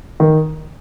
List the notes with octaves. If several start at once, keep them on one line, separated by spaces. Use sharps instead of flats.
D#3